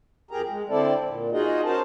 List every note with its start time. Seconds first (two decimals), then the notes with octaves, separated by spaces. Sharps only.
0.31 F2 G4 G#4 A#4 A#5
0.49 G#3
0.69 D3 C4 E4 A4 D5
1.07 A#2
1.32 D#4 F4 F#4 G#4 D#5
1.64 C#4 F#4 A#4 C5 A5